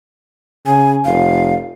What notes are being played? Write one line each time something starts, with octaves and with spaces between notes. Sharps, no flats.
C#3 G#5
F1 F5